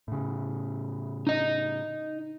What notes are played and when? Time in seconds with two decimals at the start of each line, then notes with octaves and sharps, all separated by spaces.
0.08 A2 C#3
1.27 D#4 D#5